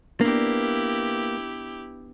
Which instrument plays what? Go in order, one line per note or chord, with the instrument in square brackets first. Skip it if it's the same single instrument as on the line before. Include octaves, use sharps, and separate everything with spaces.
[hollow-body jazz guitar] A#3 [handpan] B3 D4 [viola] E4 G4